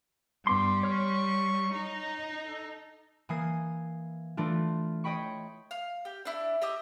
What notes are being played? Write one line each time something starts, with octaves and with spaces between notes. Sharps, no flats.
G2 G3 B3 C6 D6
C#5 C#6 F6
D#4 A#5
A4
E3 A#3 G#5 D#6 C7
E3 A3 D4 F4
C#5 D#5 G5 B5 C#6
F5
G4
D4 E4
G4 D#5 E5 D#6